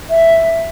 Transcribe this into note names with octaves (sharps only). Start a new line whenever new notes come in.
E5